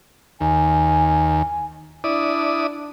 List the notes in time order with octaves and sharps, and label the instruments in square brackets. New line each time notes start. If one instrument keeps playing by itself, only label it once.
[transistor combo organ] D#2 [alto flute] G#5
[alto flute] D4 [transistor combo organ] E4 D5 D#6